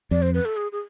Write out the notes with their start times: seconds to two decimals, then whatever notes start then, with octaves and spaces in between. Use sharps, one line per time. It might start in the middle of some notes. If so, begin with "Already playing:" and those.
0.11 F2 D5
0.22 C5
0.34 B4
0.45 A4
0.56 G#4
0.72 G#4